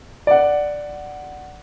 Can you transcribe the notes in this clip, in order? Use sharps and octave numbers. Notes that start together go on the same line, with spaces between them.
D5 F#5